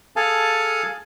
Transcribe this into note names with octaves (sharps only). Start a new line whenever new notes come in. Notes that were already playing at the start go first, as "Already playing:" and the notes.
G#4 A4 F5 G#5 A5